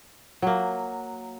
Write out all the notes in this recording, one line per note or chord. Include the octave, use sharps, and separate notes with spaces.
F#3 A#3